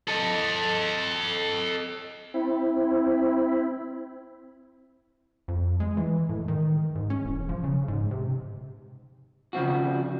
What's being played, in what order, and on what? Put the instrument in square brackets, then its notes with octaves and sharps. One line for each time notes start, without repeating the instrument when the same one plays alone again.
[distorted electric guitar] A4 D#5
[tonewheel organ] C4 E4
[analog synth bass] F2
G#3
E3
A2
D#3
G#2
C#4
E1
F3
C#3
G#2
C3
[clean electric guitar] C#3 F3 C4 F#4